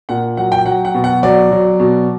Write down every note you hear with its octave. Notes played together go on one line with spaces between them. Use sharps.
A#2 F#5
F#3 F#5
G5
F#3 F#5
F#5
B2
F#5
F#3 D5
F#3
B2